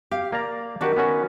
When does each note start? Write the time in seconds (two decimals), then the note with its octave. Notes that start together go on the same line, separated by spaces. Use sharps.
0.12 G4 F5
0.32 A#3 D5 A#5
0.81 D#3 D4 F#4 G4 B4
0.97 B3 C#4 F#4